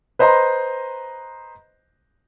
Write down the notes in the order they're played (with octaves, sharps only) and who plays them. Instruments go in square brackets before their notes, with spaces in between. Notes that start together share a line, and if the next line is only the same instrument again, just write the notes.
[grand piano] B4 C5 D#5 A#5 C6